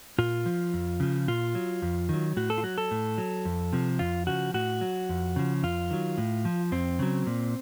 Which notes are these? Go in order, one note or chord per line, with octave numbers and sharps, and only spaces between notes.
A#2 F4
F3
F2
C#3 F3
A#2 F4
F#3
F2
D#3 F#3
A2 F#4
A4
F4
F#3 F#4
A4
A2
F#3
F2
C3 F3
F2 F4
C#3 F3 F#4
A2 F#4
F#3
F2
C#3 F3
F2 F4
D#3 F#3
A2
F3
F2 C4
C#3 F#3
A#2